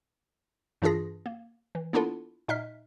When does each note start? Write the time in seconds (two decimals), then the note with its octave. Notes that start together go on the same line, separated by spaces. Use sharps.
0.82 G2 E3 D4 F4 G#4 A#6
1.26 A#3
1.75 E3
1.93 A#3 B3 D4 E4 F4 A4
2.48 A#2 D#4 D#5 E5 F6 B6